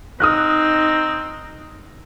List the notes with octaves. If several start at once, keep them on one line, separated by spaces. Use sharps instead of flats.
C4 D#4 D#6 F6 F#6